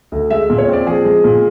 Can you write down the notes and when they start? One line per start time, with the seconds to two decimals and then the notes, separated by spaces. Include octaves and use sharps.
0.12 D2
0.30 G#3 E5
0.50 A#2
0.58 C#5
0.68 C4
0.73 D5
0.86 F3 G#4
1.05 G#3
1.24 A#2